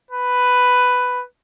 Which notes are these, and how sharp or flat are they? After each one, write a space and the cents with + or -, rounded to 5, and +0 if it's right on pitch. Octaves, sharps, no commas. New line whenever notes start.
B4 +5